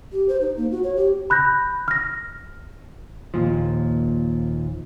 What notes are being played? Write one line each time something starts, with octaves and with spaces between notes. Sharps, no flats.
G4
C5
D#4
A#3
F#4
C#5
G4
B5 F#6 G6 A#6
F6 A#6
D#2 A#2 F3